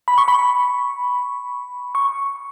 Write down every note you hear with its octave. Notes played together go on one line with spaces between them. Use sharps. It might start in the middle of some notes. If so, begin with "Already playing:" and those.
B5
C#6
B5
C#6